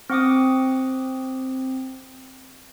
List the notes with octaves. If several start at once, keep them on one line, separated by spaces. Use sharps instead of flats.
C4 F#5 D6 D#6